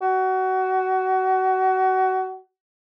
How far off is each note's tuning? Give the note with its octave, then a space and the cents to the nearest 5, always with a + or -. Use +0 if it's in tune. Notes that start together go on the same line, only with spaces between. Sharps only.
F#4 +25